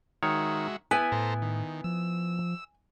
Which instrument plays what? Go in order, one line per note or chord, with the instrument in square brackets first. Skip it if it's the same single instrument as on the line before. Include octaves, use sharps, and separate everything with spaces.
[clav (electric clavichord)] D#3 C#5 [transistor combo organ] G#3 F#4 E5
[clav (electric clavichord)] B3 E4 B4 [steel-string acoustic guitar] G#5
[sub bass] A2 [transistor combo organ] A4 C5 A#5
[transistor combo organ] D#3
[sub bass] F3 [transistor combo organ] E6